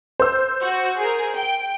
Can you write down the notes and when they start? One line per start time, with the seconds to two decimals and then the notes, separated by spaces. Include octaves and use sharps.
0.20 C5 E6
0.62 F#4
0.98 G#4 A#4
1.35 G5